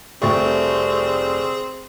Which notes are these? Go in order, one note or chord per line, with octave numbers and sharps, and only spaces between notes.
F1 G3 A3 C4 G#4 C#6